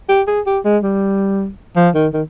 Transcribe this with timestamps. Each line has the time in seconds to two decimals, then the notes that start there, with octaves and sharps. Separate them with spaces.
0.09 G4
0.27 G#4
0.46 G4
0.65 G#3
0.83 G3
1.76 F3
1.95 D#3
2.14 D#3